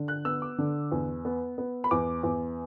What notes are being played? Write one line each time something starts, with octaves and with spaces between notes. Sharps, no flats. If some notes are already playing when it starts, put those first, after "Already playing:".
Already playing: D3
F#6
B3 E6
D6
D3
E2
B3
B3
B5
E2 D6
E2